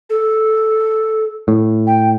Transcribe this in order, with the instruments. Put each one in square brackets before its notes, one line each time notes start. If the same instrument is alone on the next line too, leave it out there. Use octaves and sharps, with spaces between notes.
[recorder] A4
[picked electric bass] A2
[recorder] G5